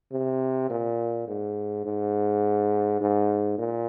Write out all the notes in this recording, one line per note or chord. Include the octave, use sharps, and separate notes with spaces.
C3
A#2
G#2
G#2
G#2
A#2